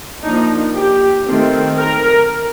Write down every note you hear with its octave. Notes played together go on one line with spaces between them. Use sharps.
F3 A#3 D4 D#4
G4
D#3 A3 C4
A#4